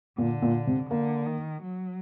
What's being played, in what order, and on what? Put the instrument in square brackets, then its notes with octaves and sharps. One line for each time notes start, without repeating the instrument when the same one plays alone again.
[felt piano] A#2 [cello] D3
[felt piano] A#2
C3
[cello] D3 [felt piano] A#3
[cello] D#3
F#3